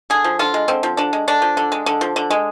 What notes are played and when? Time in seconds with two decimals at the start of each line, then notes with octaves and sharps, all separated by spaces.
0.10 D3 G#4
0.24 F3
0.39 D3 F4
0.54 G#3
0.68 D3 C4
0.83 F3
0.97 D3 D4
1.13 G#3
1.28 D3 D4
1.42 F3
1.57 D3
1.72 G#3
1.86 D3
2.01 F3
2.16 D3
2.30 G#3